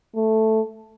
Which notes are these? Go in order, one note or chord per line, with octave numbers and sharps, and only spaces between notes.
A3